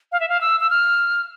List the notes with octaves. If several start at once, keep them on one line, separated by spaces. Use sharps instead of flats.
F5
E5
F5
E6
E6
F6